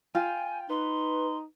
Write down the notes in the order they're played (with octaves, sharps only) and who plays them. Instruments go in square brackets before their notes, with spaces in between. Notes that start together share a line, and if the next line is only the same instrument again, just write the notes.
[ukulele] F4 [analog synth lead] G5 [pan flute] G#5
[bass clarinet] D#4 [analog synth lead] B4 [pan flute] C6